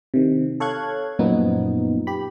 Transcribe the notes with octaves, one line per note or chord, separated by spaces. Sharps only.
C3 D#3
A4 C#5 F5 F#6 G#6
F#2 A#2 F3 B3 D#4
G4 B5